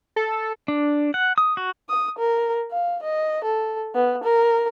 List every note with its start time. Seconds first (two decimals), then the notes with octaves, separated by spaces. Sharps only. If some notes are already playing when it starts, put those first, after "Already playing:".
0.16 A4
0.68 D4
1.14 F#5
1.38 D#6
1.57 F#4
1.89 D#6
2.18 A#4
2.71 F5
3.02 D#5
3.44 A4
3.95 B3
4.24 A#4